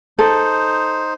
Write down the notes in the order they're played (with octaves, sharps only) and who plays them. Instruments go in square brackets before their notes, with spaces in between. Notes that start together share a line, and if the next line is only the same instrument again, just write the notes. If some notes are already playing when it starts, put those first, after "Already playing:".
[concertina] D#4 C5 [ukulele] A4